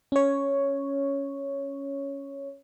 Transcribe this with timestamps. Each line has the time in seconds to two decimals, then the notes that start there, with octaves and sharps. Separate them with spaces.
0.12 C#4 C#5